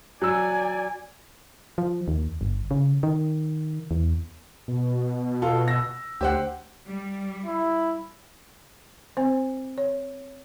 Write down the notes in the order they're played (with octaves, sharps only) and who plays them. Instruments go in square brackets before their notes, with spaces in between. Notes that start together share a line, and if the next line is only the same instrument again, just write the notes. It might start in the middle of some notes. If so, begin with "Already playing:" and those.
[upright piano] F#3 E6 [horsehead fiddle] D5 G#5
[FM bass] F3
D#2
G1
C#3
D#3
E2
[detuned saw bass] B2
[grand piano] F4 A4
E6 A#6
[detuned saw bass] D2 [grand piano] G4 C5 F#5
[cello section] G3
[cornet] E4
[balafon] C4 C5
C#5